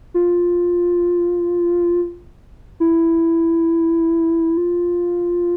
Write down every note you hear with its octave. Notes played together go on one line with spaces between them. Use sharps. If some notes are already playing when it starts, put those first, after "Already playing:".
F4
E4
F4